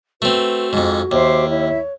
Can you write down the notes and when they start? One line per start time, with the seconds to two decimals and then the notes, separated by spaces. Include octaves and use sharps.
0.22 A3 C4 F#4 B4
0.73 F2 G#2 D6
1.11 D#2 C5 E5 D6
1.49 E4 C#5 E5